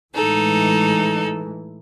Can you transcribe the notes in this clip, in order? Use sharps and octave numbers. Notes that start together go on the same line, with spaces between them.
A2 E3 G#3 D#4 A4